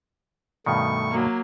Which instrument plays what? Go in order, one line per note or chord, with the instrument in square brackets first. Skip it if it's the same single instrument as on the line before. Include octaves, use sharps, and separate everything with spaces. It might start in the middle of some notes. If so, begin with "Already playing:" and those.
[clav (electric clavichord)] G2 B2 D#3 [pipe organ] A3 C#6
[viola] F#3 A#3